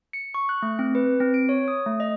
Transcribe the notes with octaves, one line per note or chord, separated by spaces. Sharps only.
C#7
C#6
F#6
A3
C4
B4
C4
D7
C#5
D#6
A3
D#5